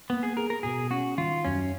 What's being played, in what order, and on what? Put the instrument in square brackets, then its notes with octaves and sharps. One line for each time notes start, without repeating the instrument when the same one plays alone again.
[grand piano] A#3 [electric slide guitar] B3
[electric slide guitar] G#4
[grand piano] G#4 [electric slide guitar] A#4
[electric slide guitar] A#4
[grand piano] B2 [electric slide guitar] G#4
[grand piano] C#4 [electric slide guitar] F#4
[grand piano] D#3 [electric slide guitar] F4
[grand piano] F#2 [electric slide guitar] C#4